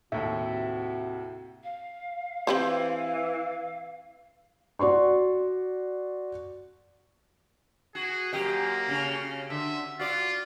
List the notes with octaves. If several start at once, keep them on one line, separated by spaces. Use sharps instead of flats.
D#2 A2 C3 F#4 E5
F5
E3 C4 G4 C5
F#4 D5 C6 C#6
F#4 G#4
F#2 A#3 G4 D#5
C#3 C#4
D3 E5
F4 F#4 D5